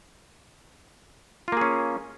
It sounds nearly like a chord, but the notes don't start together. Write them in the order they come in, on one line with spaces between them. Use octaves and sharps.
F4 A#3 G#4 C#4